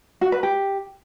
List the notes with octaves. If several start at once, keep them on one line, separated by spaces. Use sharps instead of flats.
F#4
B4
G4